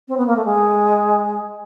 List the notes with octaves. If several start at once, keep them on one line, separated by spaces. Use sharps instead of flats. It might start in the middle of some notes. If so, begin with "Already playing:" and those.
C4
B3
A#3
A3
G#3